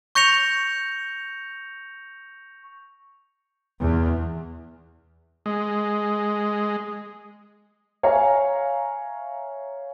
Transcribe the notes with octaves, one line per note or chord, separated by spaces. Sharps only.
C#6 G6 A#6 C#7 F7
E2
G#3
C#5 E5 F5 G#5 A#5